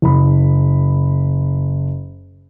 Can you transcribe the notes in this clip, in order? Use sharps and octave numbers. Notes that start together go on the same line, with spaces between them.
F#1 B5